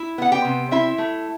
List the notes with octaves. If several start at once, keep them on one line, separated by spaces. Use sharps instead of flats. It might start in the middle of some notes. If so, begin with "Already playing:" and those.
Already playing: E4
B3 F#5
G4 G5
C3
C4 E4 E5
A3